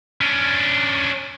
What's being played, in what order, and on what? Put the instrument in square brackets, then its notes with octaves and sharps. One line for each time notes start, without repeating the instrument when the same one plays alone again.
[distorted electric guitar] C#4 D4